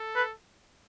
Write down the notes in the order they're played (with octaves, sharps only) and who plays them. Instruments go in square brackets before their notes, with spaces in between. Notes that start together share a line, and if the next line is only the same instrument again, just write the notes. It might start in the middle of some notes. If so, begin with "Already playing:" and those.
Already playing: [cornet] A4
[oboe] B4